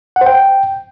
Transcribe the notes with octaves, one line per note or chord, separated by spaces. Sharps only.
F#5
C5
G5